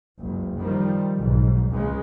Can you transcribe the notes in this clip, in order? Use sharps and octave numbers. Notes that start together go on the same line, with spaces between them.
F#1 C#2
D#3 F3 G3
B1 G#2
C#2 C#3 G#3